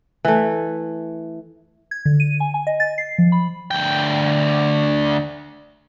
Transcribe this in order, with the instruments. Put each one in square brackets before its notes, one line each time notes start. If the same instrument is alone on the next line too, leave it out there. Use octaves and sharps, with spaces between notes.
[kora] E3 A3
[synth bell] G#6
D3
D#7
G#5
G#5
D#5
A6
C7
F3
B5
[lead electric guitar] D2 G5